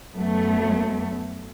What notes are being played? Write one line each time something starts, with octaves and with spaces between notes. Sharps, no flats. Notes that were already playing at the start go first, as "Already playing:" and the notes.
F#2 F#3 A3 B3